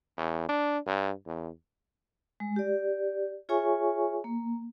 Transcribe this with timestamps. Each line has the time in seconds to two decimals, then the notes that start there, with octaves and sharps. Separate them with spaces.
0.17 E2
0.49 D4
0.87 G2
1.26 E2
2.40 G#3
2.56 G4 D5
3.49 F4 G#4 C#5 E5 G#5 C#6
4.24 A#3